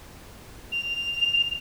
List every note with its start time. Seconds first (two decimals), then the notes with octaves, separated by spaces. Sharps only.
0.72 F7